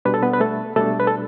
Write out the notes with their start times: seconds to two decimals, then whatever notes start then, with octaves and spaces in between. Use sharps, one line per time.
0.05 B2 G3 D4 B4
0.14 A4
0.23 B3 B4
0.33 B4
0.40 A3 A4
0.76 B2 G3 A3 D4 A4
1.00 B4
1.07 A4